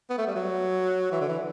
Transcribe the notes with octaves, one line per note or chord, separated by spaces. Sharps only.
B3
A3
G3
F#3
E3
D3
E3